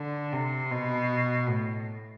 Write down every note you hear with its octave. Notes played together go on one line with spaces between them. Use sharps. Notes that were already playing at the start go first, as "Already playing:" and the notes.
Already playing: D3
C3
B2
A2